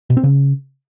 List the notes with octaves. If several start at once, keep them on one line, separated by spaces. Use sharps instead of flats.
B2
C4
C#3